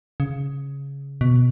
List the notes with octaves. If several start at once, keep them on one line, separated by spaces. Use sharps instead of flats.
C#3
B2